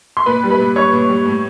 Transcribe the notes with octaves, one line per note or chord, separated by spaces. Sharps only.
C6
A#2 B4 B5
G3
B4 B5
A#2
G3 C#5 C#6
A#2
G3
A2